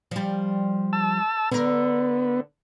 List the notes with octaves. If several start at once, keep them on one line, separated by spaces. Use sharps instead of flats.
F3 G3
A5 E6
D3 B3 A#4